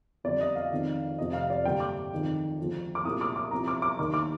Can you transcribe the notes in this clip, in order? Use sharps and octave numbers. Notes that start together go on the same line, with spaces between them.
F2 D3 G3 D5
D#5
F5
F2 D#3 G#3
F1 F2 C3 D#5
F5
D5
G2 D3 G3 A#3 G5
D6
F2 D#3 G#3
D2 D3 F3 G#3
D6
C2 A#2 G#3 D#6
D6
D6
C2 C3 F3 A#5
D6
D6
D#2 D#3 A#3 D6
D6